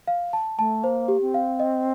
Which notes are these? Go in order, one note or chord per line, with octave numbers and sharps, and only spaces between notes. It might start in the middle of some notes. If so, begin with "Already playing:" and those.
F5
A5
A3 A5
A#3 C5
G4
C4
F5
D#5